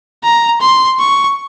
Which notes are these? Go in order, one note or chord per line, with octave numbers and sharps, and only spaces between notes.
A#5
C6
C#6